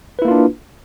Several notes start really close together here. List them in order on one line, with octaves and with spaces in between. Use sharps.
B4 E4 A#3 F4 D4